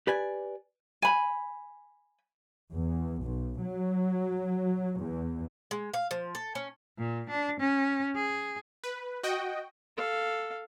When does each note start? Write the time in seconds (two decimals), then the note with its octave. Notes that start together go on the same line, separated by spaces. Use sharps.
0.07 G4 B4 D5 G#5
1.02 G#5 B5
2.72 E2
3.23 B1
3.63 F#3
4.98 E2
5.71 G#3
5.94 F5
6.11 F3
6.35 A4
6.55 C#4
6.98 A#2
7.30 D4
7.60 C#4
8.15 G#4
8.84 B4
9.23 F#4 D#5 G5
9.97 A4 F5